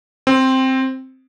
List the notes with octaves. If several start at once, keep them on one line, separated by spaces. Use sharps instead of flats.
C4